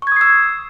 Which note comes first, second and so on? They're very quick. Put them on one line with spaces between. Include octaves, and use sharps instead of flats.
C#6 G#6 D#6 C7 E6